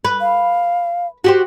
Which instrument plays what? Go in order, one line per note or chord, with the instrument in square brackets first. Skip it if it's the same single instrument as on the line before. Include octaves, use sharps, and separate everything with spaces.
[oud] B4
[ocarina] F5
[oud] F#4 G4 C5